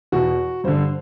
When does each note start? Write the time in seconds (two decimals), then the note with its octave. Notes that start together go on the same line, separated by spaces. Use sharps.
0.12 E2 B2 F#4
0.64 G2 D3 C5